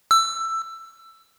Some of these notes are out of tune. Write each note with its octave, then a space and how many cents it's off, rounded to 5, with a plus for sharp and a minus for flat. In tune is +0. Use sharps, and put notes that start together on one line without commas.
E6 +15